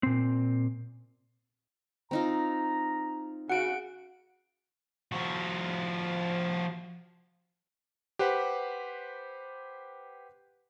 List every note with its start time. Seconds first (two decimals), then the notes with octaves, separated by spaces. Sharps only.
0.03 A#2 C4
2.11 C4 D#4 F4 A#5
3.50 C#3 F#4 F#5 D7
5.12 F3 F#4
8.19 G4 B4 C5 F#5